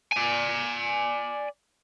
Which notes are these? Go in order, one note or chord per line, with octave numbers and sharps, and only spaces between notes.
D5 G#5